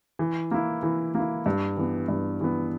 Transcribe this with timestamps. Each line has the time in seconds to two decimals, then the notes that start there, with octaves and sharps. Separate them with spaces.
0.19 E3
0.51 A#3 E4
0.83 E3
1.15 A#3 E4
1.46 G2
1.77 E3 B3
2.08 G2
2.41 E3 B3